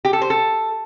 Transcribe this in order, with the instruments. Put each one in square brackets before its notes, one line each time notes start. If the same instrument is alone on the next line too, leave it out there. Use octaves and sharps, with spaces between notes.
[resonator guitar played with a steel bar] G4
A4
C5
A4